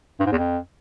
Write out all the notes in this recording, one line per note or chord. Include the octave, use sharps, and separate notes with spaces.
G2
G#2
E2
F2